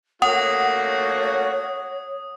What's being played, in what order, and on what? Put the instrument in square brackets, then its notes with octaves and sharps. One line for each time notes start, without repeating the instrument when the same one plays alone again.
[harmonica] A3 A#3 F#4 [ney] C#5 [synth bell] F#5 [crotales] D#6